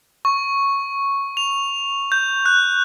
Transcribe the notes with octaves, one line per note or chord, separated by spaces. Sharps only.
C#6
F7
G6
F#6